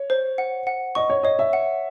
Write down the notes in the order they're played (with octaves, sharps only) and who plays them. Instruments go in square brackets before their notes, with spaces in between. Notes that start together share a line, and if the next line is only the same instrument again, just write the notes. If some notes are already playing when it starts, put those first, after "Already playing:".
Already playing: [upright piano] C#5
[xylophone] C5
F#5
F#5
[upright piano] D#5 [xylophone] C#6
[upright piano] C#5
[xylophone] C#5 [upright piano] D#5
[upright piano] E5
[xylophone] F#5